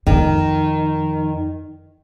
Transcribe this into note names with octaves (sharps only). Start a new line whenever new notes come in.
F2 D#3